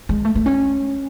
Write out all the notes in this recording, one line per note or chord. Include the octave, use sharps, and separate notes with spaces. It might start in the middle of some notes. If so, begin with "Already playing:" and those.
G#3
A3
A3
C#4